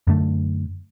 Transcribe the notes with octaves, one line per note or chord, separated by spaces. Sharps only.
F#2 D3 A3